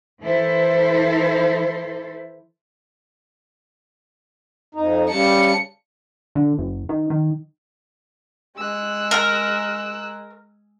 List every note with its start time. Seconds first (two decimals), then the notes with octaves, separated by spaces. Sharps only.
0.23 E3 E4 A4 C5
4.75 F2 D#4
5.10 C#3 G3 A5 C#7
6.35 D3
6.58 F#1
6.89 D#3
7.10 D#3
8.57 G#3 E6 F#6
9.11 A#4